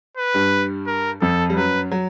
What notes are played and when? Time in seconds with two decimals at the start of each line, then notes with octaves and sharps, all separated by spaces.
0.17 B4
0.34 G2 G3
0.87 A#4
1.21 F2 F3 A4
1.50 G3
1.56 F#2 F#3 B4
1.91 F#3